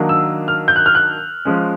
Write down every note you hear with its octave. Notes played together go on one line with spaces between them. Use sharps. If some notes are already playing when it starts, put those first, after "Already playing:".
Already playing: D#3 F#3 A#3 D4
E6
F6
G6
F#6
F6
F#6
F3 G#3 C#4